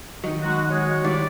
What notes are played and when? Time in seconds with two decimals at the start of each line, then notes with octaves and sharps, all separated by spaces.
0.24 D#3 F#3 D#5
0.43 G#3 D#4 F#4
0.70 G#3 F#4 C#5
1.04 D#3 G3 E4 D5